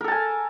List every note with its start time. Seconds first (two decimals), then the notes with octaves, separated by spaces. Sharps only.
0.01 A#4
0.04 A4
0.08 A5
0.12 G#5